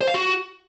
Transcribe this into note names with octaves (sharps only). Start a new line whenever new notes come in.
C5
F5
F#4